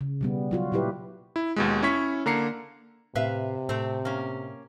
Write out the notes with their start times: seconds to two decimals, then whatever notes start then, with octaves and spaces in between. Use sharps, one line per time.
0.01 C#3
0.21 B2 G3 B3
0.51 F#3 F4 F#4
0.72 A#2 F#3 E4 G4 B4
1.36 E4
1.56 D#2 B2 G#3
1.82 C#4 E4 C#5 C#6 B6
2.26 D3 A#3 A#5 C7 C#7
3.15 A2 C3 B4 E5 F5
3.69 A2 A3 C4
4.05 A#3 C#4